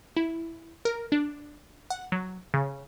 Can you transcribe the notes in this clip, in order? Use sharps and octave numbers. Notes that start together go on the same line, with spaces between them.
E4
A#4
D4
F#5
F#3
C#3